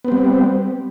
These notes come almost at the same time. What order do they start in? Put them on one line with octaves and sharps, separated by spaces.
B3 C4 G3